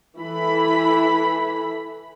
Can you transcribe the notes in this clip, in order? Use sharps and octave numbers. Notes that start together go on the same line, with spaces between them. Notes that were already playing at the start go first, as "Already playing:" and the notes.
E3 E4 A4 B5